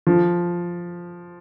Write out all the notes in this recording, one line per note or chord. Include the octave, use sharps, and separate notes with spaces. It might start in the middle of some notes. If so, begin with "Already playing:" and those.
F3